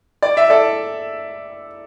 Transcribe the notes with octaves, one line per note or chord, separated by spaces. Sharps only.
D5
E5
A4 D5